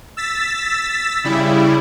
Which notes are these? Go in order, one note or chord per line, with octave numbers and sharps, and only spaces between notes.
E6 A6 B6
C#3 G3 E4